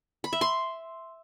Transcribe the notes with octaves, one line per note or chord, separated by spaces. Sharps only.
B5
E5
C6